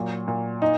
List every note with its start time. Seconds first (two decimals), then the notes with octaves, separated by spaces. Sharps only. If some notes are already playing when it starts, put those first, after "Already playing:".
Already playing: A#2 F#3
0.28 A#2
0.62 D#4